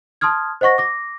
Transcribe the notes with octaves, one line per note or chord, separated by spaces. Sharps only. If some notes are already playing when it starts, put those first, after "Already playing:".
A5 C6 D#6 F6 G#6
C5 D#5 F#5 C#6 A#6
D6 A#6